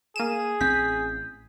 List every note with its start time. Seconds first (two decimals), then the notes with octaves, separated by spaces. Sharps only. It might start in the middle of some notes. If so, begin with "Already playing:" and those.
0.16 A#3 G#4 D#7 E7
0.61 A1 C4 G6 B6